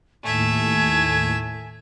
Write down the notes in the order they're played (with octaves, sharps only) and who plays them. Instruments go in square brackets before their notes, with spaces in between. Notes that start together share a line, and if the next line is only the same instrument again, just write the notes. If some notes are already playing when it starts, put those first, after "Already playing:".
[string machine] D#2 A2 [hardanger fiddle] A3 E5 [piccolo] G#5